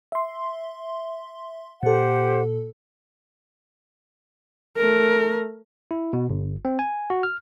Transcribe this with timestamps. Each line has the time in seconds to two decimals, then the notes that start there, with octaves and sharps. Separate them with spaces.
0.12 E5 C6
1.83 A#2 G4 A4 C5 F#5
4.77 A3 A#4
5.91 E4
6.13 B2
6.30 G1
6.65 C4
6.79 G#5
7.10 F#4
7.23 F6